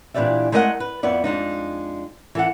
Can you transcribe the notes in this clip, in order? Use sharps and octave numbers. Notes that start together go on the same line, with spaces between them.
A#2 E3 D4 G4 D5 E5
G#3 A3 A#4 D#5 F5 F#5
B4
F2 B3 E4 D5
F2 G#3 D4 D#4
E3 A4 F#5